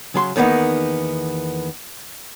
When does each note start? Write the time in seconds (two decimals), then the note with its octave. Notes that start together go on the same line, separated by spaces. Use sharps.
0.14 C#3 F#3 C6
0.36 E2 D#3 A#3 B3 D#4